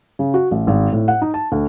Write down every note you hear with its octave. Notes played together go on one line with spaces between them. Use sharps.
C#3
F#4
A1
G#1
A2
F#5
D#4
A5
D2